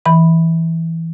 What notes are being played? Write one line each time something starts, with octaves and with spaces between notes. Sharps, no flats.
E3 B5